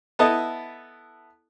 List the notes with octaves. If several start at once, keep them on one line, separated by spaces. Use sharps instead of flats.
B3 E4 A4 D#5